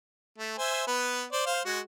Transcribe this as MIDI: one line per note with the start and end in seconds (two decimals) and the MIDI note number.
0.39 0.54 57
0.58 0.83 72
0.58 0.83 76
0.58 0.83 80
0.87 1.25 59
0.87 1.25 71
1.32 1.43 72
1.32 1.43 74
1.46 1.60 72
1.46 1.60 77
1.65 1.80 56
1.65 1.80 66